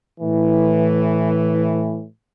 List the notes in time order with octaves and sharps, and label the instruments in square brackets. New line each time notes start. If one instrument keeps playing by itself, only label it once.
[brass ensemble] A2 E3